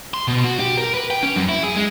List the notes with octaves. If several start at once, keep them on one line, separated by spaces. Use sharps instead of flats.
C6
B2
F#4
G4
A#4
B4
G5
C#4
F#2
E4
G#4
G#3